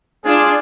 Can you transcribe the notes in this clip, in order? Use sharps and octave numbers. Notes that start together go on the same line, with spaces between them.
D4 F4 G#4